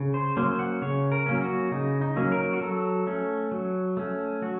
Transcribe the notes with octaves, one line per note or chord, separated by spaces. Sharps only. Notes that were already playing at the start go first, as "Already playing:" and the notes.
Already playing: C#3
C5
F#3 A#3 C#4 C5
F#5
C#3 C#5
A#4
F#3 A#3 C#4
F#4
C#3 D#4
D#4
F#3 A#3 C#4
A#4
F#4
F#3 A4
A3 C#4
F#3
A3 C#4
F#3 F#4